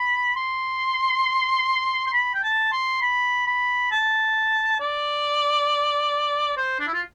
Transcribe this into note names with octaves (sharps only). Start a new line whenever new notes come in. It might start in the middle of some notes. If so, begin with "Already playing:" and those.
Already playing: B5
C6
C6
B5
G5
A5
C6
B5
B5
A5
D5
C5
D4
E4
F4